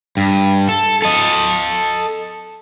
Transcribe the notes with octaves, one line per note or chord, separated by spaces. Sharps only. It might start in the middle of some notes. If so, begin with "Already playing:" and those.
G2
A4
A4 D#5